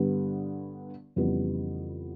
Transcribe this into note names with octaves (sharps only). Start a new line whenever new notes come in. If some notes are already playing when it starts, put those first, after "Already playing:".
Already playing: G2 D3 G3 B3
F2 C#3 E3 G3 B3